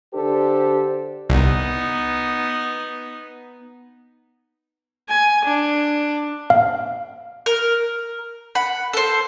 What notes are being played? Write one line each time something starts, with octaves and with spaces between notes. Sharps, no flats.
D3 D4 G4 A4 C5
C2 B3 D#4
G#5
D4
F5
A#4
F#5 B5
A4 C5